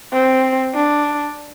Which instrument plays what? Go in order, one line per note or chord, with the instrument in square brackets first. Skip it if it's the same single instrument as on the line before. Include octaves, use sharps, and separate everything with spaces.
[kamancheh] C4
D4